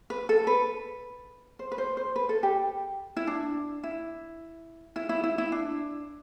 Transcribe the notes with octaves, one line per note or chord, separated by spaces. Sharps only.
B4
A4
B4
C5
B4
C5
C5
B4
A4
G4
E4
D4
E4
E4
E4
E4
E4
D4